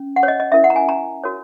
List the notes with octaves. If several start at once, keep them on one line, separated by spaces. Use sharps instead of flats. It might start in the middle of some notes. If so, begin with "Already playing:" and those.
Already playing: C#4
F#5
C#5
D#5
D#5
C#4 E4 A#4 E5
F#5
A#5
G#5
A#5
F#4 A#4 C#5